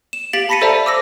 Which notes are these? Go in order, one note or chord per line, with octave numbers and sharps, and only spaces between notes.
E7
G4 F5 A6 B6 D7 F#7
A5 B5 A#6 B6 C#7 D#7
A4 C5 D5 E5 A5 A#5
D6 E6 A#6